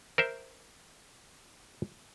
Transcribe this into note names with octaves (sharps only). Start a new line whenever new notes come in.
A#4 C5 E5